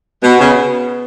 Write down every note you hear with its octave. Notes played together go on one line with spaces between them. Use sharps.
B2 B3
C#3